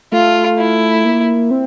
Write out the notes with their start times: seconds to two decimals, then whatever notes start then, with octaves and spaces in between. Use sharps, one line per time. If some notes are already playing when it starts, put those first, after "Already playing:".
0.12 A3 F4
0.58 E4
1.05 A#3
1.51 C4